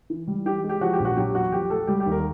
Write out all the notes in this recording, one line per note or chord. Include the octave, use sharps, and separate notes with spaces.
E3
G3
E3 G4
G#3
G4
F3 F#4
G4
A#1
F#4
F#3 G4
E2 F#4
F3 G4
A3 A4
G3 G4
G4
D#2
A#4